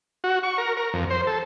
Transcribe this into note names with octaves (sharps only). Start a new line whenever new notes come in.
F#4
C#6
A#4
A#4
F2
C5
A4